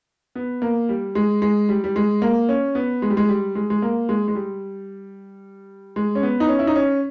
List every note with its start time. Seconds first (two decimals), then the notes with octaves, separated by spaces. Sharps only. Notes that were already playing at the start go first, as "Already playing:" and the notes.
0.35 B3
0.62 A#3
0.89 G3
1.15 G#3
1.42 G#3
1.69 G3
1.84 G3
1.96 G#3
2.22 A#3
2.49 C#4
2.75 B3
3.02 G#3
3.10 G3
3.17 G#3
3.29 G3
3.55 G#3
3.70 G#3
3.82 A#3
4.09 G#3
4.28 G#3
4.35 G3
5.96 G#3
6.15 C#4
6.23 B3
6.40 D#4
6.49 C#4
6.59 E4
6.67 D#4
6.76 C#4